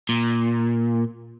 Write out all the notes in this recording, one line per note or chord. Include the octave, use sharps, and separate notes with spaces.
A#2